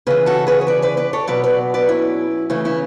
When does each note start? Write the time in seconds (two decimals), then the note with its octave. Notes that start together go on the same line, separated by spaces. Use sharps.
0.07 C#3 E3 G#4 B4
0.26 F#4 A4
0.47 G#4 B4
0.61 C#5
0.67 B4 D5
0.82 B4 D5
0.97 B4 D5
1.13 A4 C#5
1.27 B2 F#3 B4 D5
1.44 B4 D5
1.74 B4 D5
1.88 C#4 E4
2.50 C#3 E3 A3 C#4
2.65 C#4 E4